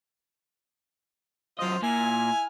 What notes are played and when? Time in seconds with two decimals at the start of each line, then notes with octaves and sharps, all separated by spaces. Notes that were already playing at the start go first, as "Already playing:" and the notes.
1.59 F#2 F4 C5 D#5 F5
1.83 A#2 E4 G#5 F6